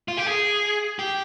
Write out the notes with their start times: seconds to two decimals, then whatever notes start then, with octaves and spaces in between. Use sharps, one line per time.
0.08 F4
0.17 G4
0.27 G#4
0.99 G4